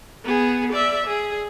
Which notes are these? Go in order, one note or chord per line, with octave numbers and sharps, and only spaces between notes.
B3 G#4
D5 E5
G#4